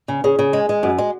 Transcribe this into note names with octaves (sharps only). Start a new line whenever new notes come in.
C#3
C#3 G#4
C#3
G#3
G#3
F#2 F#4
G#3